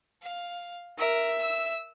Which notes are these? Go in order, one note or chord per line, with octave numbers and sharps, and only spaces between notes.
F5
A#4 E5
E6